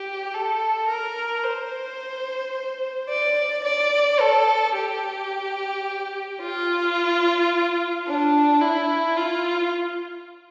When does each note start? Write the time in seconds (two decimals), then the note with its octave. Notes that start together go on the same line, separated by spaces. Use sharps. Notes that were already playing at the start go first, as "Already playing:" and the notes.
Already playing: G4
0.34 A4
0.88 A#4
1.44 C5
3.09 D5
3.64 D5
4.20 A4
4.76 G4
6.42 F4
8.07 D4
8.62 E4
9.17 F4